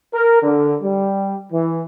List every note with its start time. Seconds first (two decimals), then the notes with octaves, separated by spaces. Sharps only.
0.14 A#4
0.43 D3
0.82 G3
1.51 E3